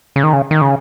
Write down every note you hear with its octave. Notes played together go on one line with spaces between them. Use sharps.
C#3
D#3
C#3
D#3
C#3